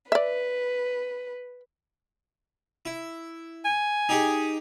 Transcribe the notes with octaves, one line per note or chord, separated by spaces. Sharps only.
B4 D5 E5
E4
G#5
D#4 G4 G#4